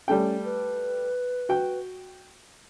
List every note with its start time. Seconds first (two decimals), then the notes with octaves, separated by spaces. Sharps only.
0.08 G3 A3 C#4 G5
0.45 B4
1.49 F#4 G5